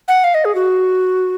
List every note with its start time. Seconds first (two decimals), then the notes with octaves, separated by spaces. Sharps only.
0.08 F#5
0.24 F5
0.34 D#5
0.45 G#4
0.55 F#4